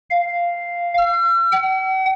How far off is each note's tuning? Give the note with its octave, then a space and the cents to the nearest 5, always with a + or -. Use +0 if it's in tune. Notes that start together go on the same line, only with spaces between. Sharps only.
F5 -5
E6 +45
F#5 +45